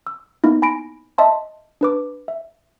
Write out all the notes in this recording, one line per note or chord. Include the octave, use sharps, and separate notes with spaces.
E6
A#3 B3 D#4 E4
G#5 B5 A#6 D7
D#5 E5 A5 C6
D4 B4 D6
E5